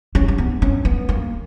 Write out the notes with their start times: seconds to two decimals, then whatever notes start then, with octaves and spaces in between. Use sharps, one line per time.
0.15 C#4
0.28 C#4
0.38 B3
0.62 C#4
0.85 B3
1.09 A#3